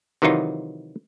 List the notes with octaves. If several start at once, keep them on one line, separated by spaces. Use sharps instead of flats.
C3 D#3 E3 F#3 D#4 F4